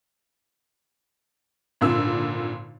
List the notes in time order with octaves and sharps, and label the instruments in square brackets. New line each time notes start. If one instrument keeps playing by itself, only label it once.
[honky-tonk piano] G#1 A#2 D3 E6